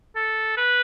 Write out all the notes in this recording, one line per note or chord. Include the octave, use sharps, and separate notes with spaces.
A4
B4